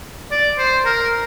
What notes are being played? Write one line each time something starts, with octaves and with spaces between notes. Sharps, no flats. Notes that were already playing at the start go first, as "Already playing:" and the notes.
D5
C5
A#4